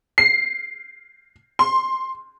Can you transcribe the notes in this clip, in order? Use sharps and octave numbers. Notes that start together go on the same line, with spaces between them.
C7
C6